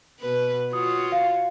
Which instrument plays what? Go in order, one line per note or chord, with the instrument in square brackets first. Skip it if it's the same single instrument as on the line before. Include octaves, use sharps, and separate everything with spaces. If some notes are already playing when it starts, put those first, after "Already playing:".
[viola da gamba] B2 B4
[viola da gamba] F4 F#4 C#5 [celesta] D#6
[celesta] F5